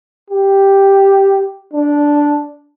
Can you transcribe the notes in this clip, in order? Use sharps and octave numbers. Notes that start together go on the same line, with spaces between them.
G4
D4